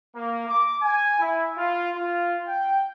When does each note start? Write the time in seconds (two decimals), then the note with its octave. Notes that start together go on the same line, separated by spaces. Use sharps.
0.14 A#3
0.48 D6
0.82 G#5
1.19 E4
1.57 F4
1.95 F4
2.47 G5